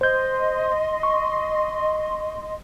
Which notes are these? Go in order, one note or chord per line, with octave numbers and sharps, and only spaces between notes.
C5 D#5 C6 G6
C#6